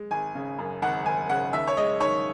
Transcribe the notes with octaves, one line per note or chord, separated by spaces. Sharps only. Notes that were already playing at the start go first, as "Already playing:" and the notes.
Already playing: G#3
G#1 G#5
C#3
F#2
G#1 F#5
G#1 G#5
C#3 F#5
D#2 E5
C#5
G#3 D#5
D#3 C#5